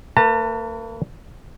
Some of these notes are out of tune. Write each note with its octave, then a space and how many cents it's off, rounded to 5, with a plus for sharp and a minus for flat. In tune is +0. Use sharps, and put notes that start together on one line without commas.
A#3 -45 B4 -15 A5 +35